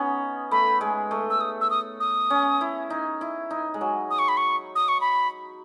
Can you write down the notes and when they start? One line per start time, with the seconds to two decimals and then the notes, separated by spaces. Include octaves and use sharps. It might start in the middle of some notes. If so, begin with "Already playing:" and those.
Already playing: B3 C#4 D#4
0.51 A3 B5
0.81 G#3
1.11 A3
1.30 E6
1.41 D#6
1.61 E6
1.70 D#6
2.00 D#6
2.30 C#4
2.61 E4
2.90 D#4
3.21 E4
3.51 D#4
3.74 G#3
3.81 F#3
4.10 D#6
4.19 C#6
4.28 B5
4.37 C#6
4.75 D#6
4.88 C#6
5.01 B5